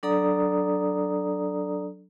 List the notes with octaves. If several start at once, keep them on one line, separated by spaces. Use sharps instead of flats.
F#3 D4 A4 D5 A#5 D#6